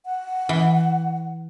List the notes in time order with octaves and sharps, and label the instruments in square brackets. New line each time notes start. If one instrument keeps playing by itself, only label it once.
[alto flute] F#5
[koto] E3